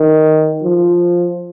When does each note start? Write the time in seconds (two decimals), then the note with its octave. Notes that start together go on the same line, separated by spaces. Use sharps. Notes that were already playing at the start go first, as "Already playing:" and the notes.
Already playing: D#3
0.63 F3